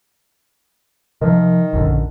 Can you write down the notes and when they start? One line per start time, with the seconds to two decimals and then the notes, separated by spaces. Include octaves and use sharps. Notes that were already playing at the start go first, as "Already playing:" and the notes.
1.21 C3 D#3 F3
1.73 A#1 F#2 D3